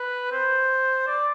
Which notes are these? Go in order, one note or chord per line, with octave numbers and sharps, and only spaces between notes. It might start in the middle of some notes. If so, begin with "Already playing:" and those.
Already playing: B4
C5
D5